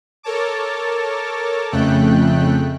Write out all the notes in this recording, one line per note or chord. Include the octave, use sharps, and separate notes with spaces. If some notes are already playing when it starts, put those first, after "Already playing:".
A4 A#4 C#5 A5 D6
F2 C#3 A3 G5 F#6